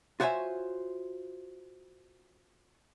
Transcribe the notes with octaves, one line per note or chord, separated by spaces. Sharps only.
F4 F#4 C5 C#5 E5 G#5